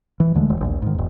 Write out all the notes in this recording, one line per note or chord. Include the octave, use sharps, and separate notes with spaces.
E3
D#2 D3 G#3 A3
E1
A#1 D#2
G#2 D#3
E1 E2